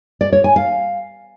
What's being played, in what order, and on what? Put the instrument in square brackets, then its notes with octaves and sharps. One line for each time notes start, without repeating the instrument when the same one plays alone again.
[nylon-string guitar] D5
C#5
G#5
F5